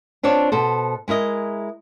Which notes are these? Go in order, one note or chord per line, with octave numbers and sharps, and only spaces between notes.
C4 D4 F4 C#5 A5
B2 A4 C5
G#3 E4 A#4 D#5